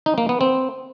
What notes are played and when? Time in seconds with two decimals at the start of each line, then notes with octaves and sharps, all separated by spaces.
0.06 D#4
0.18 A#3
0.29 B3
0.41 C4